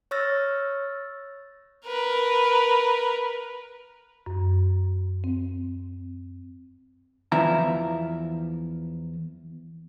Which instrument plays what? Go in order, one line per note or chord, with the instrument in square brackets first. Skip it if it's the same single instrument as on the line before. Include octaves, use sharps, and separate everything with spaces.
[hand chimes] C#5 C#6 E6 F6 A6 A#6
[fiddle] A#4 B4
[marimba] F#2
C4
[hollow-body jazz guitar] E2 E3 F3 E4 A#5